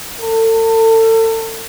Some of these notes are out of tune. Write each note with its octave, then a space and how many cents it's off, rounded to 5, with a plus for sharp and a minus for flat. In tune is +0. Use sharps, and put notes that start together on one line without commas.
A4 +35